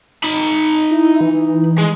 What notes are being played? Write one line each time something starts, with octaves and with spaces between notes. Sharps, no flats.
D#4 B5
E4
E3
G#3